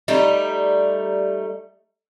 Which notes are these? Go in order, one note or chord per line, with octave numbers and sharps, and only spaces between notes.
G3 A3 D#4